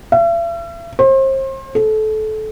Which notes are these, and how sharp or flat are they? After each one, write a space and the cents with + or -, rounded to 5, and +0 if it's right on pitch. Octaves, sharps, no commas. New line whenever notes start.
E5 +45
C5 +35
A4 -25